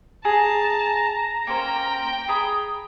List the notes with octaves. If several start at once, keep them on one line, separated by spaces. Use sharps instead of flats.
G#4 A5 A#5
A#3 C#4 C5 G5
G#4 A#5 B5 D#6